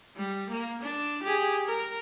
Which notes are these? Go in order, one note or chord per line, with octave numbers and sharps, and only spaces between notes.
G3
A#3
D4
G4 G#4
A#4